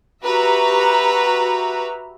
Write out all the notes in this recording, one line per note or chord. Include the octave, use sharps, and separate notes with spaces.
F#4 G4 B4 E5 A#5